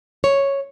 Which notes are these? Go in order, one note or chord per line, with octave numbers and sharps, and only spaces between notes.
C#5